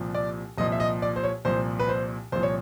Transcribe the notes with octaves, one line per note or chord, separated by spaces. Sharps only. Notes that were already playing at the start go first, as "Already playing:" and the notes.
Already playing: C2 A#2 F3
D5
C2 A#2 F3 D#5
E5
D#5
D5
C5
C#5
C2 A#2 F3 C5
B4
C5
C2 A#2 F3 C5
C#5